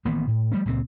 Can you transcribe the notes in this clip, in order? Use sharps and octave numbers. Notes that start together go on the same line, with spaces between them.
A1 D#3 A#3 B3
A2
F3 G3 A3 C#4
C#2 A#2 F3 C4